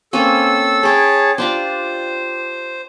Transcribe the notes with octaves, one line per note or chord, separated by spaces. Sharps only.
A#3 C4 C#4 A4 E6
G#4 C#5 G5 A5 B5
D4 F4 G4 C5